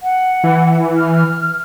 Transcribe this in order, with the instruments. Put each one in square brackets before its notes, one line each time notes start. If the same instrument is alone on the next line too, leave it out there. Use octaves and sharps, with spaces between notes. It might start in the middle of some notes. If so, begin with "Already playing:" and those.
[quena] F#5
[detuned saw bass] E3
[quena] F6